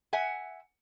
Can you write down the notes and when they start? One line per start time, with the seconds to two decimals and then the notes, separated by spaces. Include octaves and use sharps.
0.13 E5 F#5 G#5